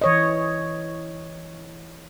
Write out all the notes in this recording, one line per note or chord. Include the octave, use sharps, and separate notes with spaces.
E3 C#5 D#5